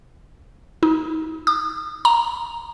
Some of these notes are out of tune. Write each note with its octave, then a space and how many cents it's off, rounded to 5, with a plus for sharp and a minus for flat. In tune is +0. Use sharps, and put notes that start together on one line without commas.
D#4 +35
D#6 -40
A#5 +5